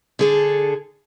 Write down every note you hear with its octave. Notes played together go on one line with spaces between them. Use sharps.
D3 G#4 A4